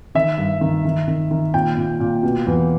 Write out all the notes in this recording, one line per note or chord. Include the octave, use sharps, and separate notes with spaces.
D#3 E5
G2
D#3
D#3
D#3
D#3
A#2 G5
A#2
A#2
B2
E2